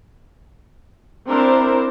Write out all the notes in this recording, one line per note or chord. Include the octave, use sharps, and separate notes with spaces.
C4 D4 E4 A#4 C5